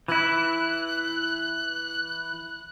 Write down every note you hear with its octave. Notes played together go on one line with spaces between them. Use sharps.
E3 E4 F#6